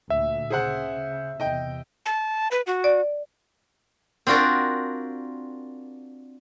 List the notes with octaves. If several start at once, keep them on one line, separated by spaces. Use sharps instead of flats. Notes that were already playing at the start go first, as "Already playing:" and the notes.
D2 A#2 E5
C#3 G#4 C5 F#5
E2 C3 D#5 G5
A5
B4
F#4
D5
C4 D4 F4 F#4 A#4